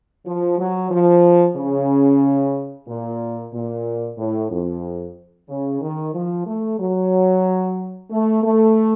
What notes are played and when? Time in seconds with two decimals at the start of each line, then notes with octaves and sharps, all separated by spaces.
0.25 F3
0.58 F#3
0.91 F3
1.57 C#3
2.87 A#2
3.52 A#2
4.18 A2
4.50 F2
5.49 C#3
5.81 D#3
6.14 F3
6.47 A3
6.79 F#3
8.10 A3
8.43 A3